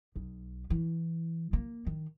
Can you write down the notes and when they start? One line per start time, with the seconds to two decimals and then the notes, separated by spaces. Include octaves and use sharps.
0.16 B1
0.70 E3
1.53 A#3
1.87 D#3